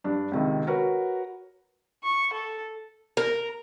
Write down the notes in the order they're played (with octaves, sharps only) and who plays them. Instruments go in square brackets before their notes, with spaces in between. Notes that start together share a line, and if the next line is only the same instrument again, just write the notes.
[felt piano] G2 D4
C#2 C3 D#3
F#4 A#4 B4 C#5
[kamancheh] C#6
A4
[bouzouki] A#4